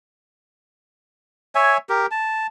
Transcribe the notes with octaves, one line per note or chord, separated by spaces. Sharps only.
C#5 E5 G#5
G4 A#4
A5